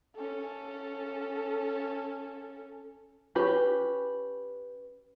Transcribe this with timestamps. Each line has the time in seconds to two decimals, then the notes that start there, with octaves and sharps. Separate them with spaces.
0.16 C#4 A4
3.35 C#4 G4 B4